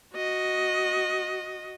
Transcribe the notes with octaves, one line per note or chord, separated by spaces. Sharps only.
F#4 D#5